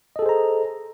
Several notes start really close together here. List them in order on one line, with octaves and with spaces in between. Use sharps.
D#5 A4 G#4 C5 A#5